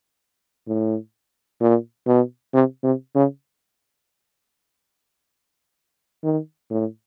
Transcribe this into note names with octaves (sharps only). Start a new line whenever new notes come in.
A2
A#2
B2
C3
C3
C#3
D#3
A2